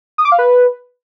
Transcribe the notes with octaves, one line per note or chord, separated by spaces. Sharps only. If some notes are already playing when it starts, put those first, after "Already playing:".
D#6
D6
F5
B4